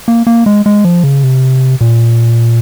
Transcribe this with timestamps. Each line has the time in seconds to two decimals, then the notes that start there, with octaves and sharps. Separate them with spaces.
0.08 A#3
0.27 A#3
0.46 G#3
0.66 G#3
0.85 F3
1.04 C#3
1.23 C3
1.81 A#2